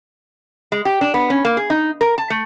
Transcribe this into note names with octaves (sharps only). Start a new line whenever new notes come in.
G#3
G4
D4
B3
C#4
A#3
G#4
D#4
A#4
A5
A3